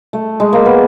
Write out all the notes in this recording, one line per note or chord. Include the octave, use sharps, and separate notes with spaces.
A3
G#3
A#3
B3